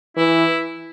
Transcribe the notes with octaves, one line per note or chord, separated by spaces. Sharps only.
E3 E4